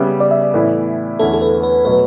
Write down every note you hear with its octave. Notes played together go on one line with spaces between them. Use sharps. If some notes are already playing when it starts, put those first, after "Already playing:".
Already playing: C#3 G3 B3 E5
D5
E5
D5
A2 E3 B3 E4
E2 D3 A3 C#4 E4 A4
A4
B4
B4
B2 F#3 A3 B4